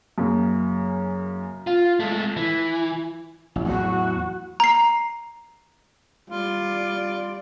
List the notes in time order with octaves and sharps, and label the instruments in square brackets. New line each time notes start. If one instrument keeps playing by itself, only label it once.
[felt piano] F#2 C#3 A#3
[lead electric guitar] F4
G#3 A3
E3
[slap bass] A1
[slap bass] E2 A2 F#3 [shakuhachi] F#4
[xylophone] A#5 C7
[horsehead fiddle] G3 D5 [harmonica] F4